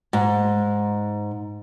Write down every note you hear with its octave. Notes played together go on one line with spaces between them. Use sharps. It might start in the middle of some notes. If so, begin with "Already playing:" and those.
G#2